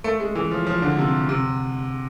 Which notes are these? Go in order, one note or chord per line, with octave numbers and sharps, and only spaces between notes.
A3
G#3
E3
F3
F3
D3
C3
C3